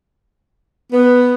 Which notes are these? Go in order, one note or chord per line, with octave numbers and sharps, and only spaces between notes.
B3